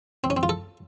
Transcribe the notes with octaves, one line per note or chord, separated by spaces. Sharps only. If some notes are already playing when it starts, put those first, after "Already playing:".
C4
C#4
C4
F4
A4